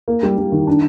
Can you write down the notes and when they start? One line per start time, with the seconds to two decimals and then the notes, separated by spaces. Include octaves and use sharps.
0.08 A#3
0.23 G3
0.38 G3
0.52 D#3
0.67 D4